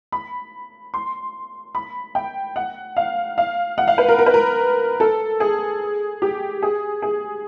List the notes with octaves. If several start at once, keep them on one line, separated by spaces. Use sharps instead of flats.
B5
C6
B5
G5
F#5
F5
F5
F#5
F5
B4
A#4
A#4
B4
A#4
A4
G#4
G4
G#4
G#4